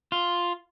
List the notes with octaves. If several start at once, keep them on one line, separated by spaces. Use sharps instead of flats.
F4